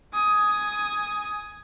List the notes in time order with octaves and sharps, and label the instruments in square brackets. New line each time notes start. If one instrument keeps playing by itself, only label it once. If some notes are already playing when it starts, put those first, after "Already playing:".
[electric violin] G#5 D#6